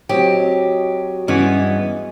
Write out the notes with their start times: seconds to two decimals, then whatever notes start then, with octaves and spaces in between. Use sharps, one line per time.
0.09 F#3 C4 F#4 G4 D#5
1.28 G2 E3 G#3 B3 C#4